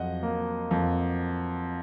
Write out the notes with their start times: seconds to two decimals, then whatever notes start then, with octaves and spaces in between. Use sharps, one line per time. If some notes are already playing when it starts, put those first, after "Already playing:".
Already playing: F2 F#3 D#5 F#5
0.23 A#3
0.71 F2